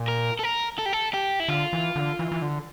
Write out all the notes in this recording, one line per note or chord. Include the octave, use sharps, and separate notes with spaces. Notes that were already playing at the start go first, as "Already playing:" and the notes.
Already playing: A#2
A#4
A4
A#4
A4
G4
A4
G4
E4
D3 F4
E3
D3
E3
E3
D3